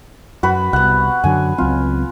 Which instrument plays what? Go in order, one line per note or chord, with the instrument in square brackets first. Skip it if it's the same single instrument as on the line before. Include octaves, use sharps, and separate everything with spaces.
[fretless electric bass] F#2 [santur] F#4 B4 B5
[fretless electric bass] C2 [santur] B3 F#5
[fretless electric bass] F#2 D3 F#3 [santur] G#5
[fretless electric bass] C#2 F#3 C4 [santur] F4